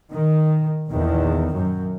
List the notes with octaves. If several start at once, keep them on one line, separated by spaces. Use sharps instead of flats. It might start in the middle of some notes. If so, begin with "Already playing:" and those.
D#3
A#1 E2 D#3
F#2